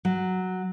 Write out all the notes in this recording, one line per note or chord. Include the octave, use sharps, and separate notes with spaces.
F#3